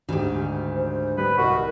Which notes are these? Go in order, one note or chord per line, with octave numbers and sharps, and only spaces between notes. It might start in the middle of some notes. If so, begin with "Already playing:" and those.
D2 G#2 D#3 G4
C5
G3 B4
C2 F#4 A#4 D#5